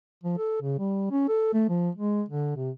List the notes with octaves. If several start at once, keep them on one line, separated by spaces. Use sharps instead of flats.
F3
A4
C#3
G3
C#4
A4
A3
F3
G#3
D3
C3